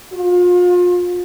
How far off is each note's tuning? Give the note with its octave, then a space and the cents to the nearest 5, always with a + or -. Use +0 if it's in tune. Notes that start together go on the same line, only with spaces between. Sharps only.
F4 +35